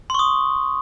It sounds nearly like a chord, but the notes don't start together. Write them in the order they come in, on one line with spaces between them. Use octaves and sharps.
C6 C#6 D#6